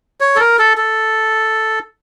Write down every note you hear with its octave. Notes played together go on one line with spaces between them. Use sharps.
C#5
A4
A#4
A4
A4